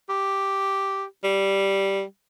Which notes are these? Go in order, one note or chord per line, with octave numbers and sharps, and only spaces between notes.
G4
G3